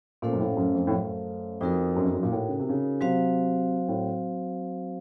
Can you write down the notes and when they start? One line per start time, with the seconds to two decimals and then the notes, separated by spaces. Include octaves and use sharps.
0.22 A#2 A3 C#4 A4 C5 F5
0.33 F#2
0.40 A2
0.57 F#2
0.75 F2
0.87 A2
0.92 F#2
1.61 F2 D#4 F#4 A#4
1.96 F#2
2.04 F2
2.13 F#2
2.23 A#2
2.32 A2
2.49 C#3
2.59 C3
2.69 C#3
3.01 C3 F#3 C4 F#4 C5 F5
3.88 A2